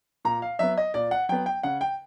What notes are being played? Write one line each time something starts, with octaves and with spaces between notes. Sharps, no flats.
A#2 A#5
F5
F#3 B3 E5
D#5
A#2 D5
F#5
F#3 B3 G5
G5
C#3 F#5
G5